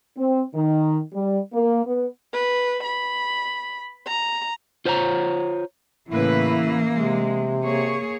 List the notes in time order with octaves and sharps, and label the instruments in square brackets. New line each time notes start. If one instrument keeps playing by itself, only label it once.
[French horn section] C4
D#3
G3
A#3
B3
[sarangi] B4
B5
A#5
[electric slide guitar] F4 C5 C#5 G#5 A#5
[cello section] A2 C#3 B4 [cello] E3 A#3 [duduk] E4
[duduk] C3 [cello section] G#3
[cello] A#3 G#4 [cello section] C#5